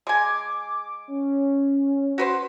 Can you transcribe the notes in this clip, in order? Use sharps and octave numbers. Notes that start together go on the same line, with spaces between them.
G#3 G#5 D6
C#4
F#4 B4 C5